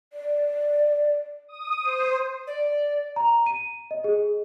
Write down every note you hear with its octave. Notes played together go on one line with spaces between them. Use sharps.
D5
D#6
C5
D5
A#5
D#7
D#5
G#4